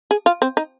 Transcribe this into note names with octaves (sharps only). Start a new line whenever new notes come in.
G#4
F4
C4
D#4